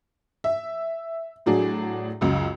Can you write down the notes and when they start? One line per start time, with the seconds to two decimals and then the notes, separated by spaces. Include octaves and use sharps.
0.44 E5
1.46 A2 F#3 D4 G#4
2.21 C#2 F#2 C#3